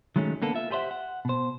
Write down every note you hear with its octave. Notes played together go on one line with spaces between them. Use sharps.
D#3 F#3 G#3 A3 C#4
D3 A#3 B3 A4
F4 E5
G4 G#4 C5 C#5 E5 F#5
F#5
B2 C5